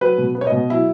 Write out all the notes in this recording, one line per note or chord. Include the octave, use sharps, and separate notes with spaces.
F#3 B4
B2
B3
C#5
D#5
B2
F#3 E4